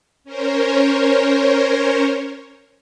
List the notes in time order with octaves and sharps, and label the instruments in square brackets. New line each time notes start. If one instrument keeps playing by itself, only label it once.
[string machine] C#4 A#4 C5 C#5